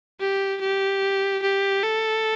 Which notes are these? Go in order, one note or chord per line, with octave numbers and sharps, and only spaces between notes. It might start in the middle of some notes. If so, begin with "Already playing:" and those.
G4
G4
G4
A4